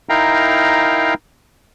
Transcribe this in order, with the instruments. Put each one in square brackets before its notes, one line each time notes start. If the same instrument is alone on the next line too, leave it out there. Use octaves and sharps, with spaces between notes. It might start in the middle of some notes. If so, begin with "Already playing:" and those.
[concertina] D#4 E4 A#4 F5 G5 A#5